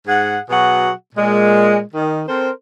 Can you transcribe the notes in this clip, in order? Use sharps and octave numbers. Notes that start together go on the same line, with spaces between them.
G#2 G#4 F#5
B2 F#3 F#4 G#4 F#5
A#2 G#3
D#3
C4 A4 A#4 C5